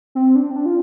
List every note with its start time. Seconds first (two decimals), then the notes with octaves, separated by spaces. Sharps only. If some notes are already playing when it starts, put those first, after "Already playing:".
0.15 C4
0.36 D4
0.51 C4
0.56 D4
0.66 F4